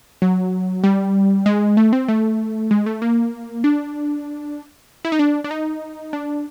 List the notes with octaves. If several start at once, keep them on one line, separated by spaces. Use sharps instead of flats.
F#3
G3
G#3
A3
C4
A3
G#3
A3
A#3
D4
E4
D#4
D4
D4
D#4
D4